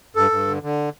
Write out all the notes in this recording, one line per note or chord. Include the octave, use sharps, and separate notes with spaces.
G2 A4
G2
D3
D3